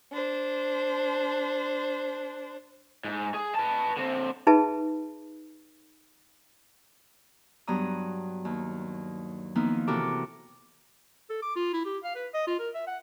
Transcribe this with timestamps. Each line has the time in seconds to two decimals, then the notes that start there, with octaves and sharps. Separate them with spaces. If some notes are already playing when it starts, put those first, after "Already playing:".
0.12 D4 C5
3.05 G#2
3.34 G#4
3.55 B4 A5
3.97 D3 C4
4.47 D#4 G#4 B4 E5 A5 B5
7.67 G2 F#3 B3 A#5 D#6
8.45 D#2
9.55 D#3 F3 A#3 B3 D#4 E4
9.87 C3 E3 F#4 A4 A#4 D6
11.30 A4
11.42 D6
11.56 F4
11.73 E4
11.85 G4
12.04 F5
12.16 B4
12.34 D#5
12.47 F4
12.59 A#4
12.74 E5
12.87 F#5